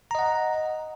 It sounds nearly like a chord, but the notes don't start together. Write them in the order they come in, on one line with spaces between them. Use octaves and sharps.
A#5 D#5 F#5